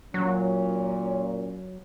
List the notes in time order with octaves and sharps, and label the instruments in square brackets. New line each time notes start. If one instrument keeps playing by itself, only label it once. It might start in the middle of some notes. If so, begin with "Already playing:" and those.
[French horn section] A#2 C#4 [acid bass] F#3